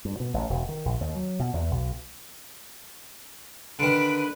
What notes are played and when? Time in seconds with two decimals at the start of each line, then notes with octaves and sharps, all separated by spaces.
0.05 G2
0.20 B2
0.34 A1
0.50 E1
0.69 D#3
0.85 A#1
1.01 D#2
1.15 F#3
1.40 B2
1.54 E2
1.71 B1
3.79 D3 D#3 B4 B5